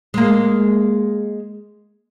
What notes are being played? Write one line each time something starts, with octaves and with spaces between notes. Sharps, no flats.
G#3 A#3